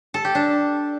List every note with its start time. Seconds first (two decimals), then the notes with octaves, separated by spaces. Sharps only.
0.14 A4
0.25 G4
0.35 D4